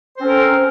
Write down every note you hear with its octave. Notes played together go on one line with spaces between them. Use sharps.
C4 C#4 A4 A#4 C5